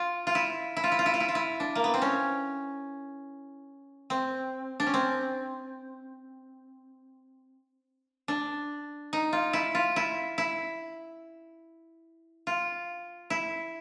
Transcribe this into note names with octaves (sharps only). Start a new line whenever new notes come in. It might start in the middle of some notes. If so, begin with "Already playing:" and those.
Already playing: F4
F4
E4
E4
F4
E4
F4
E4
F4
E4
F4
E4
D4
A#3
B3
C4
C#4
C4
D4
C#4
C4
D4
D#4
F4
E4
F4
E4
E4
F4
E4